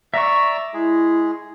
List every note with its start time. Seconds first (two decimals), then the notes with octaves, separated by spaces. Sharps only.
0.14 D5 E5 A#5 C#6 E6
0.74 G#3 E4 G#4